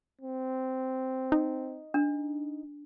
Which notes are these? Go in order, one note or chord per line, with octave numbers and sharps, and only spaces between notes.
C4
D#4
D4